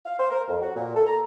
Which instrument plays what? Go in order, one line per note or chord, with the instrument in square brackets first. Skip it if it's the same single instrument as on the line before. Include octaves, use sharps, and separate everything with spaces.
[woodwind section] F5
C5
A#4
F2
F#4
A#2
A4
A#5